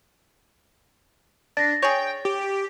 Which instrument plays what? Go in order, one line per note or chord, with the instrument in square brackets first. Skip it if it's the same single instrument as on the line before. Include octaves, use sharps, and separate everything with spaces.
[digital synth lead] D4 [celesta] A6 A#6
[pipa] G#4 C#5 [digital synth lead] G5
[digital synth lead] G4